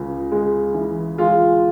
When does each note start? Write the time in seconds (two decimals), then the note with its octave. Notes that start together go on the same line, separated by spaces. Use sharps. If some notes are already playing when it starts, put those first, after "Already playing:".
Already playing: C#2 C#3
0.32 G#3
0.74 E3
1.18 G#3 F4